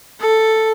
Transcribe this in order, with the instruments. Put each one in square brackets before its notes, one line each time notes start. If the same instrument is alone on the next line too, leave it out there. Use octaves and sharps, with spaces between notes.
[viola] A4